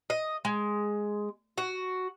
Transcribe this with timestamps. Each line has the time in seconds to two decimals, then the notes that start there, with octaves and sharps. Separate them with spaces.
0.10 D#5
0.45 G#3
1.58 F#4